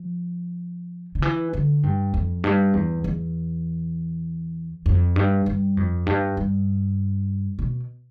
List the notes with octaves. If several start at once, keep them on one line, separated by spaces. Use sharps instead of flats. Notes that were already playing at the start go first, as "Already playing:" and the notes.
Already playing: F3
D3
E3
D3
G2
F2
G2
E2
E2
F2
G2
G2
F2
G2
G2
B2